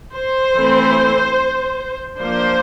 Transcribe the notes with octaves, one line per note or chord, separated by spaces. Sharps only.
C5
E3 A3 C4
F3 A#3 D4 C5